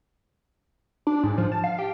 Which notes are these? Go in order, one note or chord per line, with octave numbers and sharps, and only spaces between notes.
D4
G#2
F3
A5
F5
G4